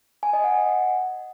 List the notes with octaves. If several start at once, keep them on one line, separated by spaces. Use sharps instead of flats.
G#5
D#5
F#5